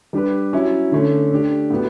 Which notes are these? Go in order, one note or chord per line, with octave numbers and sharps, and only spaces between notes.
G3 D4 G4 B4
F#3 C#4 E4
D3 A3 C#4
A3 D4 G4
A2 F#3 B3